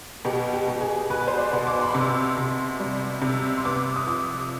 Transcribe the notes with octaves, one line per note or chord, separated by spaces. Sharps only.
B2 G4
G4
B2
G#4
B2 B4
C5
D5
B2
D6
C6
B5
C3 C6
C3
G3
C3
C6
B3 D6
D#6
F3 D6